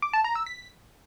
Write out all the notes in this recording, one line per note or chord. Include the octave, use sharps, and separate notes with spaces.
D6
A5
A#5
E6
B6